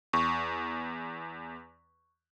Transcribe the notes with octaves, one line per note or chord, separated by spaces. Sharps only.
E2 C#6